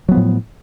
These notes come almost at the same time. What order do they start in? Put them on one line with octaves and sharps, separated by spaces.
F#3 B3 F3 A2